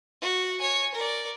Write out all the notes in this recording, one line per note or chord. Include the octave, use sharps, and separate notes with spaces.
F#4
C#5 G#5
A#4 D5